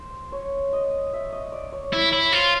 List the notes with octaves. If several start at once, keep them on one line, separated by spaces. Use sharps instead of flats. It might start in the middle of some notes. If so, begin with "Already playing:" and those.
Already playing: C5
C#5
D#5
E5
D#5
D5
C#5
E4 C#5
E4 C#5
F4 C5